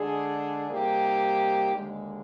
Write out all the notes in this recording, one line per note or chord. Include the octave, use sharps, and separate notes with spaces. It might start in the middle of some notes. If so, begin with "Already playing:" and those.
Already playing: D3 G#3 D4 G#4
C3 G3 A#3 D#4 G4
D#2 D3 G#3